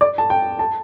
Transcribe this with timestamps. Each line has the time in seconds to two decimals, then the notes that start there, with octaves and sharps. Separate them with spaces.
0.01 D5
0.18 A5
0.30 G5
0.59 A5